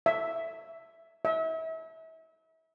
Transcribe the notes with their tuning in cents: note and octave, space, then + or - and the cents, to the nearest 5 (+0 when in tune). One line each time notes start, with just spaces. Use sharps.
E5 +0
E5 -35